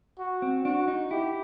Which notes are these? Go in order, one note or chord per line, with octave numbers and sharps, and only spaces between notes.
F#4
C4
D4 F#4
D#4
E4 G4